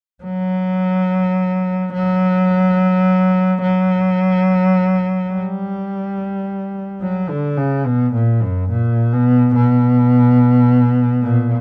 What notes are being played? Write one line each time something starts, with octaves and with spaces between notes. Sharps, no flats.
F#3
F#3
F#3
G3
F#3
D3
C#3
B2
A#2
F#2
A#2
B2
B2
A#2